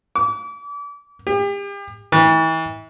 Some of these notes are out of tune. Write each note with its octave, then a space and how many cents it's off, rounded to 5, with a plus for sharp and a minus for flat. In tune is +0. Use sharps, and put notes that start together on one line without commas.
D6 -35
G4 +40
E3 -35